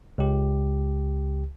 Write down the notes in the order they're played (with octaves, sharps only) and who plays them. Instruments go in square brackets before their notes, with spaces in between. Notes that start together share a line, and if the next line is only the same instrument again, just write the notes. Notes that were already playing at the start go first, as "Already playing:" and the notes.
[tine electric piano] C#2 G4